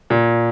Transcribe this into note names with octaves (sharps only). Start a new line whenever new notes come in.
A#2